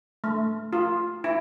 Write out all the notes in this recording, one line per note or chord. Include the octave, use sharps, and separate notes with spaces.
A3
F4
E4